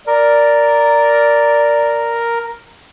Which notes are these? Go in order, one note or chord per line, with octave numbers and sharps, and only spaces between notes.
A#4 D5